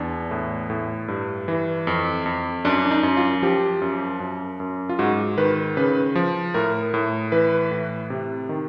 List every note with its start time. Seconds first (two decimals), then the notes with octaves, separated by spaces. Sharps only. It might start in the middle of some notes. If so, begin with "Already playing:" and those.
Already playing: E2 D4
0.31 A2
0.70 A2
1.08 G2
1.48 E3
1.87 F2
2.26 F2
2.65 F#2 D4
2.85 D4
2.91 D#4
3.03 F#2
3.17 F4
3.42 F3 G4
3.82 F#2
4.20 F#2
4.60 F#2
4.89 F4
4.99 G#2 F#4
5.38 D#3 B4
5.77 C#3 B4
6.15 F3
6.54 A2 A#4
6.94 A2
7.32 E3 B4
7.71 A2
8.10 C3
8.49 D#3